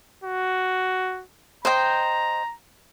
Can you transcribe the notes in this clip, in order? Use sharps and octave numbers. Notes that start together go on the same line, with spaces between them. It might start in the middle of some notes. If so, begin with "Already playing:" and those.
F#4
C5 D#5 G5 A#5